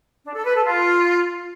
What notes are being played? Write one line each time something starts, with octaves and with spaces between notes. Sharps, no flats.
D4
A4
B4
A4
F4